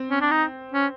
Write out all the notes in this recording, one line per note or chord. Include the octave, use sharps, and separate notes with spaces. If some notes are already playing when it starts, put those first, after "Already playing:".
Already playing: C4
C#4
D4
D#4
C#4